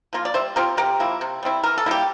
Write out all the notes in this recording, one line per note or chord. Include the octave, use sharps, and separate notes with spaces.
F3 A#3 F4
D5
G3 C5 E5
C4 F4 G4 A#4
C3 G4 A#4
F3 A#3 E4
C3
G3 C4 E4
E3 A#4
A4
G3 A#3 E4 G4